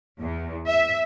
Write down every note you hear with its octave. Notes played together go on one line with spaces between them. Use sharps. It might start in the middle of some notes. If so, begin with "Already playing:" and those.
E2
E5